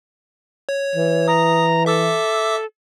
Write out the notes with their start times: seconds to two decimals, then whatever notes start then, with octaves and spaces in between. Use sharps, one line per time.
0.69 C#5
0.96 E3
1.28 A#5 D#6
1.86 A4 E5 D6 E6